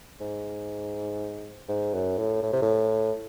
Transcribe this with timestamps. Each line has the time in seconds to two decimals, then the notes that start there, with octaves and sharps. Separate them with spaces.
0.21 G#2
1.69 G#2
1.94 F#2
2.18 A2
2.43 A2
2.53 C3
2.62 A2